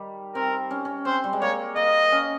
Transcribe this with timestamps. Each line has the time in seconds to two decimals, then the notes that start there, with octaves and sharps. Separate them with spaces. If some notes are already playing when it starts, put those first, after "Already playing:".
Already playing: D#3 G3
0.35 C4 A#4
0.71 C#4
0.85 C#4
1.05 C4 C5
1.24 G3
1.33 G#3
1.42 A#3 C#5
1.76 A#3 D#5
2.12 C#4